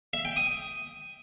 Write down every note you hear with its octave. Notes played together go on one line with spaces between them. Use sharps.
E5
G5
D#6